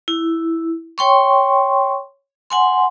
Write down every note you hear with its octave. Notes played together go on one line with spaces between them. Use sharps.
E4
C#5 G5 C6 C#6
F#5 G#5 C6